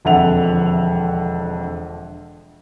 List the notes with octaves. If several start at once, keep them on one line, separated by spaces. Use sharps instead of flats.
E1 F2 D3 E5 F#5 F7